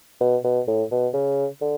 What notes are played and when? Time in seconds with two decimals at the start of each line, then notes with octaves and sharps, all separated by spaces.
0.20 B2
0.44 B2
0.67 A2
0.91 B2
1.14 C#3
1.61 D3